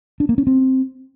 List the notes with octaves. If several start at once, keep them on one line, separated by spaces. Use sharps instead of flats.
D4
A#3
C#4
C4